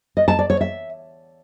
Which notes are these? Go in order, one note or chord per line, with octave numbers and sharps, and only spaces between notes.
D#5
A5
D5
C#5
E5